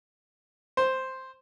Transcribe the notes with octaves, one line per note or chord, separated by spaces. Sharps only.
C5